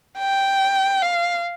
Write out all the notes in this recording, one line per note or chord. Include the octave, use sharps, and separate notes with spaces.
G5
F5